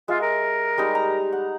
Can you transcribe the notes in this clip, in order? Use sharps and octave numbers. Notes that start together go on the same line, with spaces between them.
G#3 F4 E5
A#4
G3 G#3 D#4
A#5
F#5